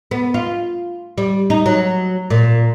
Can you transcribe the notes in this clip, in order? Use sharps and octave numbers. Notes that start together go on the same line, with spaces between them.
B3
F4
G3
D#4
F#3
A#2